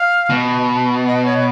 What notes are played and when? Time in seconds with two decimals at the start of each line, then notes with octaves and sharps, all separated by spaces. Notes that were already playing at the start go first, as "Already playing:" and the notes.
Already playing: F5
0.29 B2
1.07 D#5
1.25 C#5